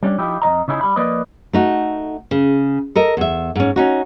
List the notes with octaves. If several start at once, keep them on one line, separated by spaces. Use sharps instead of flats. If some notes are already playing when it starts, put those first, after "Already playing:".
G3 C#4 D4
F3 D#4 E4 G4
F2 F3 D#5 A#5
C#3 D#4 E4 G#4
G3 B5
F3 A#3 B4 D5 D#5
A3 D#4 F#4
C#3
A4 A#4 D#5
E2 E5
G#2 C#4
C#4 D#4 F#4